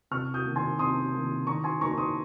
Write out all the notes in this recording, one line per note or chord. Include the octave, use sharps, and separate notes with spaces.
C3 C#6 F6
D#6 G6
D#3 A#3
G#5 C6
C3 C6 D#6
D#3 A#3
D#3 A#5 C#6
G#5 C6
A#3 D#4 A#5 C#6
C6 D#6